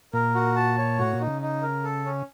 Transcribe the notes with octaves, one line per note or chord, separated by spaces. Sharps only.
A#2 A#4
F#4
A5
C#5
A2 F#4
A#2
D#4
C#3
D#4
A#4
A4
C#4